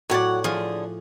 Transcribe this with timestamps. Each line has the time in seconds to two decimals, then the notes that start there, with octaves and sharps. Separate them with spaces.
0.10 A2 F#3 C#5 D5 F#5
0.44 D3 F3 G#4